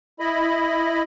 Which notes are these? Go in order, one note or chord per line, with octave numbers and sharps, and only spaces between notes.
E4 D#5 B5